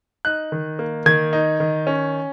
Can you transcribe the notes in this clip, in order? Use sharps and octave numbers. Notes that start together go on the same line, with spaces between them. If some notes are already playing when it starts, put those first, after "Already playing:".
D#4 F#6
D#3
A#3
D#3 G#6
D#4
D#3
C#4